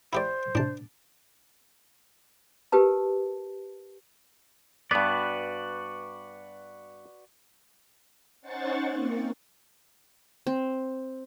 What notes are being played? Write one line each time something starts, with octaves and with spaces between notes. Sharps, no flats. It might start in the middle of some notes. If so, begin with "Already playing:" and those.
E4 G4 C5 D5
A2 C3 D4 A5
G4 A#4 B4 A5
G2 B3 F#4 B4 D5
C#4 D#4 C5 F#5 C#6 A6
A#3 C4
C4